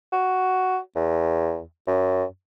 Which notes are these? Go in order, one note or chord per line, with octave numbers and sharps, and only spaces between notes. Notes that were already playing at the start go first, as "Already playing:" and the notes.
F#4
E2
F#2